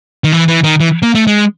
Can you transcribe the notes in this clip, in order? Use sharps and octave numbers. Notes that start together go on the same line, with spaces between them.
D#3
E3
E3
D#3
E3
A#3
A3
G#3